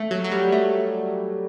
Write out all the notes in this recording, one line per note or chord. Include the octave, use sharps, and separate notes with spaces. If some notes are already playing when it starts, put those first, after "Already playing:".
Already playing: A3
F#3
F#3
G3
A3